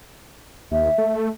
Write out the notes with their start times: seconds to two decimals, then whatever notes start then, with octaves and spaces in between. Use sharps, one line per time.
0.72 D#2 E5
0.98 A3